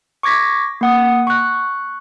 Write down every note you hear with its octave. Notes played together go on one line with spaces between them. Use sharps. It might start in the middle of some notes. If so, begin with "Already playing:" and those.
C#6 D6 G#6 A#6 B6
A#3 F#5 D#6
C#6 F#6